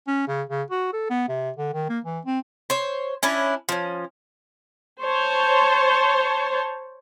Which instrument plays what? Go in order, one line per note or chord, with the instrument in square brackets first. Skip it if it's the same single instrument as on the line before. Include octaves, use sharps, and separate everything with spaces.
[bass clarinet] C#4
C#3
C#3
F#4
A4
B3
C3
D3
D#3
A#3
E3
C4
[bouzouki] C5 C#5
C#4 D4 E4
F3 C#4
[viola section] C5 C#5 A5